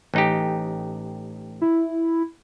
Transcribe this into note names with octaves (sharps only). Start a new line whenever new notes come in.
A1 D#4 G4
E4